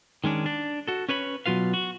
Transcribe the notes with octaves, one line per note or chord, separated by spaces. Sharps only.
D#3 G#3 C#4 D4
D4
F#4 A4
C#4 B4 C#5 B5
B2 F#3 F4 B4 F5
F#4